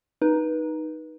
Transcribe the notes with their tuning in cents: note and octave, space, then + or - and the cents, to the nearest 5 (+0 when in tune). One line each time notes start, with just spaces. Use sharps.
D#4 +0 B4 -25